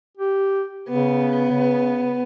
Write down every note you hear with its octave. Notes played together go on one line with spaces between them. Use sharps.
G4
C#3 B3
C#3